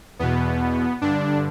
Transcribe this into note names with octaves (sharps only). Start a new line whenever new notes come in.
E2 B2 B3
G2 D3 D4